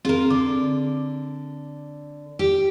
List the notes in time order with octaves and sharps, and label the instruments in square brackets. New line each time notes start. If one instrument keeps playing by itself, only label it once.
[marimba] C4 G#4 [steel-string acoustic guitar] F4 A#4
[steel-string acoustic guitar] D3 [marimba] D6
[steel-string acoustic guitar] G4